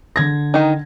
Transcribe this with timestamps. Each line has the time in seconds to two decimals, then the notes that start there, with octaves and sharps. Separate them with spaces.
0.16 D3 G#6 A#6
0.54 D#3 D#4